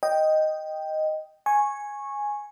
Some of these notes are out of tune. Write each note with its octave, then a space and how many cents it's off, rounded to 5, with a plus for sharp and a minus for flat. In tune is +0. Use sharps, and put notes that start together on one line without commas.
D#5 +0 G5 +0
G#5 +0 C#6 -15